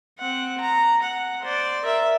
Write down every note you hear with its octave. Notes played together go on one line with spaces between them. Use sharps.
C4 F#5
A#5
F#5
C5 D5
A#4 E5